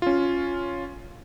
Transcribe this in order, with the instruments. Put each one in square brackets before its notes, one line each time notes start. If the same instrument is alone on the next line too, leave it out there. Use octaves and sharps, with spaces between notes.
[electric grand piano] C#4 F4